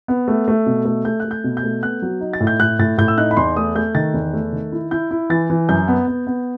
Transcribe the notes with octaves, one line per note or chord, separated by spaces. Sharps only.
B3
A3
A3
B2
A3
A3 G6
A3 F#6
G6
B2
G6
A3
B3 F#6
F#3
D#4
A6
A2
G6
A2 F#6
A2 A6
A2 G6
E6
D#4 F#6
B5
E2 C6
A3 D#6
A3 G6
D#3 A6
E2
A3
D#3
E4
E4 G6
E4
E3 A6
E3
F#2 G6
B3
B3
B3